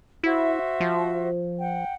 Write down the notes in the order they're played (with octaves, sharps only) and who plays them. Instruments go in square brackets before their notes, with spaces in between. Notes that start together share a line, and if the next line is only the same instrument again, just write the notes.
[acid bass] E4 [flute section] F#4 C5 E5
[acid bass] F3
[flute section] F#5 G5